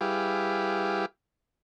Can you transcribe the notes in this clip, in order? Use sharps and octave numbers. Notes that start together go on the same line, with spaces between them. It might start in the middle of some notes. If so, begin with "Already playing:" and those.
G3 E4 G4 G#4 B4 F5